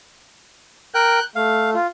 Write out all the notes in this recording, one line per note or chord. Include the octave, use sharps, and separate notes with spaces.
A#4 G5 F#6 G6
A3 F5
F4